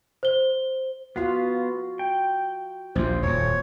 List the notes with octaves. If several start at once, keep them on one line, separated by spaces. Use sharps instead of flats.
C5 G7
B3 F4 F#4 F5
G5
A#1 D#2 F4 C5
D#1 F2 C#5